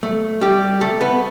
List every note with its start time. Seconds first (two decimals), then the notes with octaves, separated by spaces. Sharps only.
0.03 A3
0.41 G3 G4
0.81 A3 A4
1.01 B3 B4